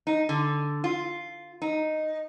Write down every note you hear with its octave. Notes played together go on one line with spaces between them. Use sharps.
D#4
D3
F4
D#4